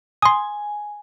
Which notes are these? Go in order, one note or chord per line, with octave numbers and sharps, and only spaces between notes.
G#5 C6 D#6